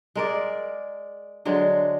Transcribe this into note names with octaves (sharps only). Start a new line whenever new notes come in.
G#3 A#4 D5
D3 F#3 G#3